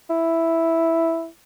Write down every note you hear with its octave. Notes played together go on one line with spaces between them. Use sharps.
E4